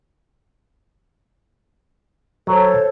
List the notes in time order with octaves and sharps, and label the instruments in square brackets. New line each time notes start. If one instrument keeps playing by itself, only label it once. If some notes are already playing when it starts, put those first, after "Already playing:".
[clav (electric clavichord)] F#3 [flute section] A4 C5 C#5